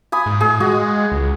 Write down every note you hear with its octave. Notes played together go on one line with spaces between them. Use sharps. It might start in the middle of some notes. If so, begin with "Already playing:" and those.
G#5 B5 D#6
G#2
A2 G#4
G#3 F#4
C#2